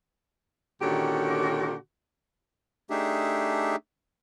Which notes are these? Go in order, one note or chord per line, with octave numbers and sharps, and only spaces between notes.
A#2 D3 D#3 C#4 F#4 G4
A3 D4 D#4 G4 G#4 E5